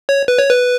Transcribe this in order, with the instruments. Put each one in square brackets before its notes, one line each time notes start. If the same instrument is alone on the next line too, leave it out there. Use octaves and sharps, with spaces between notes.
[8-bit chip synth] C#5
B4
C#5
B4